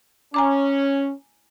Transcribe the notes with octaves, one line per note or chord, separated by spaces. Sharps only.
C#4 G#5 A#5 D6